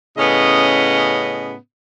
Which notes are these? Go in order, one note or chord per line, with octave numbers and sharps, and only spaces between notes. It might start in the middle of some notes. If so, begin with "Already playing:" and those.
A2 C#3 B3 C#4 D#5